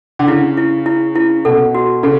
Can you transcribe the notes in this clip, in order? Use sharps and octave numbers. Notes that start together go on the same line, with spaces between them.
D3
C#3 E4
E4
E4
E4
B2 A4
F#4
C#3 A4